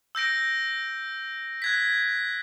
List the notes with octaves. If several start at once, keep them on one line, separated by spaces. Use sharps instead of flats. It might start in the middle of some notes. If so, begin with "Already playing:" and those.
E6 G6 A#6 D7
F#6 G#6 B6